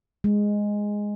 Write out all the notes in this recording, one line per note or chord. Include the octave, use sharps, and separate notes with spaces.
G#3